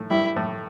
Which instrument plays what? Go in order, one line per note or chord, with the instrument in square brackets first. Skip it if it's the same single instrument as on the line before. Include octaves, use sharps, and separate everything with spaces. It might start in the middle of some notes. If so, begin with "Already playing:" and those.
Already playing: [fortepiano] A2 A3
[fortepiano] G2 G3 [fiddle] E4
[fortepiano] A2 A3